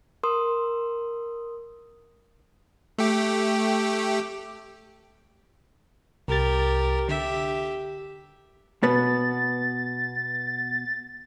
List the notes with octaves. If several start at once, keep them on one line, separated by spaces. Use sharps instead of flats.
A#4 C6 D#6
A3 G4
C2 G4 A#4 A6
D3 G4 E5
B2 B3 A6